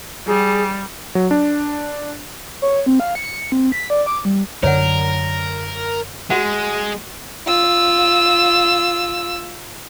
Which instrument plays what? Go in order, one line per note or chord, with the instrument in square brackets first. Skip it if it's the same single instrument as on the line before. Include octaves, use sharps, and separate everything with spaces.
[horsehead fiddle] G3 [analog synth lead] G#4
[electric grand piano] F#3
D4
[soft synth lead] C#5
C4
F5
C#7
C4
B6
D5
D6
G3
[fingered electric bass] F#2 D3 F#3 [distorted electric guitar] A#4 [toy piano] C#5 D5 F#5
[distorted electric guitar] G#3 [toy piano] F#4 F#5
[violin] F4 E6